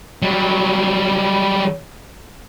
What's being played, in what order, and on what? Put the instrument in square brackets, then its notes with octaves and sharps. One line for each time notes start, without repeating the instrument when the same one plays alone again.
[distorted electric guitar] F#3 G3